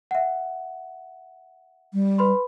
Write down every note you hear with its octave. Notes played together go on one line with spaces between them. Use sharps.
E5 F#5
G3
B4 B5 C6